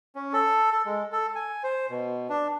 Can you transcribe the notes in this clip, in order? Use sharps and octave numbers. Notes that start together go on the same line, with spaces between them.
C#4
A4
A4
G#3
A4
G#5
C5
B2
D4